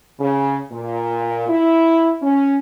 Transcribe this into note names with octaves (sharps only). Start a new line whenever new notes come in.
C#3
A#2
E4
C#4